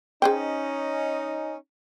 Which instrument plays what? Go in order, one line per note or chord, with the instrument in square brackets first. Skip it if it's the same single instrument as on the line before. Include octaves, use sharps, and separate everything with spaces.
[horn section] C#4 D#4 [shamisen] G#4 C5 G5